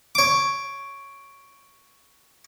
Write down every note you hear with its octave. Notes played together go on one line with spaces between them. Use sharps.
C#5 D6